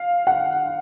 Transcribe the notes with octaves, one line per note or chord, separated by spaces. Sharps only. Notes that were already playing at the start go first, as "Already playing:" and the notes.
Already playing: F5
F#5